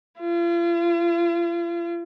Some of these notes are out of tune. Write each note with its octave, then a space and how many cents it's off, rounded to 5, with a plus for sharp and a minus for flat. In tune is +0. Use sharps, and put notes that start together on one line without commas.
F4 -40